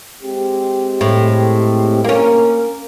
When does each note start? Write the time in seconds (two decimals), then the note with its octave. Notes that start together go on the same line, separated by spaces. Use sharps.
0.23 G#3 C4 G4
1.01 A2
2.04 A#3 C#4 A#4